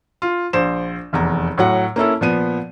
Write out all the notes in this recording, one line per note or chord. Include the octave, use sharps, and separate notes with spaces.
F4
A#1 C5 E7
F1 E2 A#5
A2 F#3 F#5
A#3 C#4 E4 A4
A#2 F3 B3 D#7